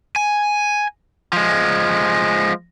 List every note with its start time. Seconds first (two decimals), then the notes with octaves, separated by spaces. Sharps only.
0.16 G#5
1.33 F3 G#3